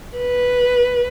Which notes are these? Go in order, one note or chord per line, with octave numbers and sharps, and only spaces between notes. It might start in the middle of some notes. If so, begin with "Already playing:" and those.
B4